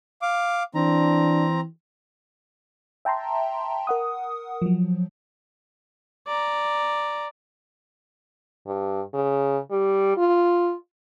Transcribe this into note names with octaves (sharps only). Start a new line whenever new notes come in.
F5 D6
E3 C4 D4 A#5
E5 G5 A5 A#5 C6
A#4 F#5 D#6
F3 F#3
D5 A#5
G2
C#3
G3
F4